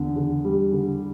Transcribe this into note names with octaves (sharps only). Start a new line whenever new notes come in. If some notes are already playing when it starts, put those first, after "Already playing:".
Already playing: E2 D3
D3
G3
D3